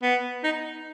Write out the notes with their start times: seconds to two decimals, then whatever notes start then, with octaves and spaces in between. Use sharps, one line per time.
0.03 B3
0.44 D#4